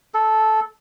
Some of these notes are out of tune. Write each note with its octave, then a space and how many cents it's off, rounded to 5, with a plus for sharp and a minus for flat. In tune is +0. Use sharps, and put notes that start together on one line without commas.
A4 -10